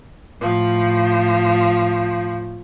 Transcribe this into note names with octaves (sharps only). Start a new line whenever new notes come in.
A2 F3